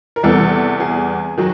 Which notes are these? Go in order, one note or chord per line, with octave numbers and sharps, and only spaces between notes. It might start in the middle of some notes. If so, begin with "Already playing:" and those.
A#4
E2 C3 E3 G3 A4
G#4
D#3 F#3